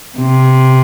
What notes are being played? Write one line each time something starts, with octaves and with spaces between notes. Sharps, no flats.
C3